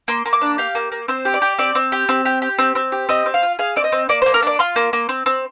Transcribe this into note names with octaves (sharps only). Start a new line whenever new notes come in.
A#3 C6
A#3
D6
D4
G4 F5
A#3
A#3
C4 C5
G4
D5
G4
C4 D5
C4
G4
C4
G4
G4
C4
C4
G4
C4 D#5
C4
F5
F4
G#4 F5
C4 D5
D#5
C4
A#3 D5
C5
A#3
A#4
D4 D5
F4 C6
A#3
A#3
C4
C4